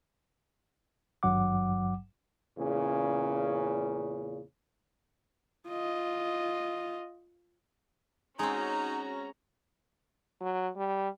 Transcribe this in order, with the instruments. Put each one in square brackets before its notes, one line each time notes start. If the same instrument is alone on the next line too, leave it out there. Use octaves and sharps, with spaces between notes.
[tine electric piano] G#1 G2 F#3 F#5 D6
[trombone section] E2 A#2 C#3
[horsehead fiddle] F4 D#5
[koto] G#3 C4 [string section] C#4 F#4 A#5 [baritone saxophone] D#4
[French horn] F#3
G3